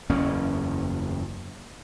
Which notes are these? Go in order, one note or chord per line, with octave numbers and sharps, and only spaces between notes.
F#1 E2 A#3 C#4